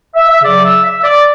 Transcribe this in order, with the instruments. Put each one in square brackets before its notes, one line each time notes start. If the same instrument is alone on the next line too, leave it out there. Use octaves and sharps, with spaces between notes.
[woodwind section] E5
E5
C#3 F#3 D5
E5
E5
D5